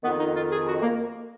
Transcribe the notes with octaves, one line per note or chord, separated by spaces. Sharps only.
F2 D#3 B3
D#4
F4
G#4
F#4
A#3